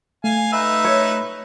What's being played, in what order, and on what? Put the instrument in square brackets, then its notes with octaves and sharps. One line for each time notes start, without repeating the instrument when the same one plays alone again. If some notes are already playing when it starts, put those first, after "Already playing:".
[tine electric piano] A3 [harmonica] F5 G#5
[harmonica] D#4 B4 E5
[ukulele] C#5